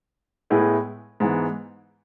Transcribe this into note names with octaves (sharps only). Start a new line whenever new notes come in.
A2 G#3 B3 E4 G#4
G#2 E3 B3